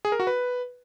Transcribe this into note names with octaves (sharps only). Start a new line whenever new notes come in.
G#4
A#4
F#4
B4